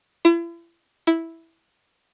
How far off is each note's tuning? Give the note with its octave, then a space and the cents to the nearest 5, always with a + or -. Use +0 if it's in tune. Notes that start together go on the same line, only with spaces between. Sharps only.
E4 +40
E4 -5